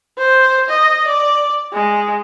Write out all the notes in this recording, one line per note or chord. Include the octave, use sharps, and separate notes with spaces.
C5
D#5
D5
G#3